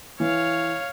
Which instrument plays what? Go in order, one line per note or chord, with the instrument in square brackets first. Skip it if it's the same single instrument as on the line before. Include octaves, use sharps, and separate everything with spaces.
[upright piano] E3 [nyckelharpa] C#5 F5